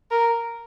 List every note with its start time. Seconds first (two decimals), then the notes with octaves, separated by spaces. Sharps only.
0.11 A#4